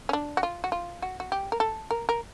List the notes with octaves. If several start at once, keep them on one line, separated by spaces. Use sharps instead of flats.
C#4
D4
F#4
F4
F#4
F4
F#4
F#4
G4
A#4
A4
A#4
A#4